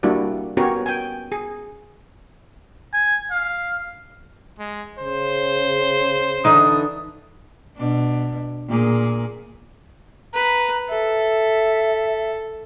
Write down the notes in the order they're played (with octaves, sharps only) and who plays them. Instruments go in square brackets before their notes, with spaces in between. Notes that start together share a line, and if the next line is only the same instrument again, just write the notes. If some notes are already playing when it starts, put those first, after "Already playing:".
[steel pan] G3 A#3 D4 E4 F#4 D5
B3 C#4 F#4 G4 A#4 C#5
G5 G#5
G#4
[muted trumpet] G#5
F5
[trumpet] G#3
[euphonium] C#3 [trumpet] C5
[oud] D3 E3 D#4 [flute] D#6
[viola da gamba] B2 D4
A#2 A#3 G#4
[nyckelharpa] B4 [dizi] A#5
[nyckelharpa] A4 [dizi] E5